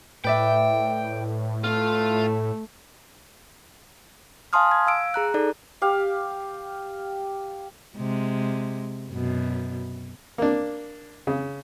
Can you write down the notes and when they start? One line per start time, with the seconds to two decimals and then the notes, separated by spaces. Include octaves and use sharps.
0.24 A2 B4 D5 E5 G5
1.64 A3 F4
4.53 F5 G#5 A5 C6 D#6 F6
4.71 G#6
4.87 F5 E6 D7
5.14 G#4 A#5 F#6
5.34 D#4 A4 D5
5.82 G4 F5
7.96 C3 G#3
9.11 F#2 B2
10.38 A#3 D4
11.27 C#3